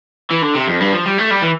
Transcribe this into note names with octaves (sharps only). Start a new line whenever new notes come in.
E3
D3
C3
F2
G2
F3
G3
A3
G3
E3